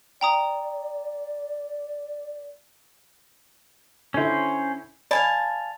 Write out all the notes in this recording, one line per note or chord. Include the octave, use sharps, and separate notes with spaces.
D5 G5 A#5 D#6
D3 C#4 E4 C5
D5 F5 G#5 A5 B5